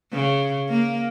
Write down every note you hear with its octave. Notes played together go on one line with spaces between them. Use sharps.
C#3
A#3